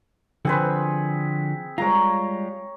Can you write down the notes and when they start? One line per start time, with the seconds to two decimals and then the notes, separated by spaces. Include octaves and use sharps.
0.45 D3 F3 C4 F#4 G#4 B4
1.78 G3 G#3 F4 C#5 A#5